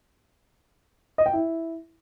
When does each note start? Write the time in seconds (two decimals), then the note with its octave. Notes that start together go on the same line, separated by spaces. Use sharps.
1.18 D#5
1.26 G5
1.33 E4